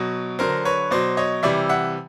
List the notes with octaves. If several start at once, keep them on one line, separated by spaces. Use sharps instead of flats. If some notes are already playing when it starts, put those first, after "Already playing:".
Already playing: B2 F#3
D3 F#3 A#4 C5
B4 C#5
B2 F#3 C5 D5
C#5 D#5
C3 E3 G3 D5 E5
E5 F#5